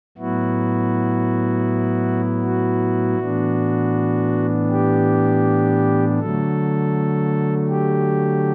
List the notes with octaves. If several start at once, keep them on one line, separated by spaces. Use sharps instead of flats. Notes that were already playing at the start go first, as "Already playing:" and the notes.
A2 F#3 B3 E4 F#4
F#4
A2 E3 B3 D4
G4
D3 F#3 A3 A4
G4